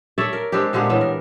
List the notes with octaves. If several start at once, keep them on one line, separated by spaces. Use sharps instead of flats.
A4 C#5 D5 E5
A#4
G#3 C4 D4 G4
A#2 D3 G#3 G4
A2 E3 B3
A#4